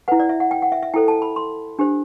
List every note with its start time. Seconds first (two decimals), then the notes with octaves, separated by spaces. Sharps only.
0.08 E4 B4 F#5
0.20 D5
0.29 E5
0.40 F#5
0.51 G5
0.62 F#5
0.72 E5
0.82 E5
0.94 E4 A4 C5 G5
1.08 A5
1.22 B5
1.36 C6
1.79 D4 G4 C5